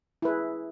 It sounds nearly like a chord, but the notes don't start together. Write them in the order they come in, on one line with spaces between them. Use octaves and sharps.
E4 B4 G#4